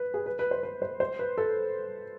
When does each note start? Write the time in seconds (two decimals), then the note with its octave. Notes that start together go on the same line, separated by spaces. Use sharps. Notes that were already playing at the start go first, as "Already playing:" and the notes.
Already playing: B4
0.14 G#4
0.26 B4
0.39 B4
0.51 C5
0.63 B4
0.82 C5
1.00 C5
1.19 B4
1.38 A4